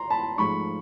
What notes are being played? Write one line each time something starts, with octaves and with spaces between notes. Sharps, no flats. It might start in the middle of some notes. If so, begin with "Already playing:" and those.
Already playing: A#5 C6
A5 B5
G#2 F3 A3 B5 C#6